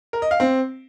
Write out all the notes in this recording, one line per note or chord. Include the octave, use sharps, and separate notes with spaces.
A#4
D#5
F5
C4